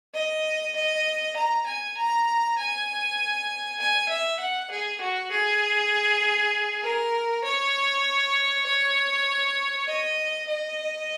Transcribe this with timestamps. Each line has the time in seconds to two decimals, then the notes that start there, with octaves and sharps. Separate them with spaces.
0.14 D#5
0.76 D#5
1.36 A#5
1.67 G#5
1.97 A#5
2.58 G#5
3.80 G#5
4.09 E5
4.40 F#5
4.71 G#4
5.01 F#4
5.31 G#4
6.83 A#4
7.44 C#5
8.66 C#5
9.88 D#5
10.48 D#5